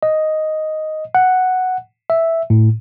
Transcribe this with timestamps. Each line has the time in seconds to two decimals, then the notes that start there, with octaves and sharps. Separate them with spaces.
0.03 D#5
1.15 F#5
2.10 E5
2.50 A2